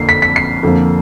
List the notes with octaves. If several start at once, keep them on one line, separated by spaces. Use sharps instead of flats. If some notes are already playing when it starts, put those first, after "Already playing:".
Already playing: F2 D3 F3 A#3 C7
B6
B6
C7
F2 D3 F3 A#3